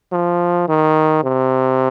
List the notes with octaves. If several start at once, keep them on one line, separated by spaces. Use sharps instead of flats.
F3
D#3
C3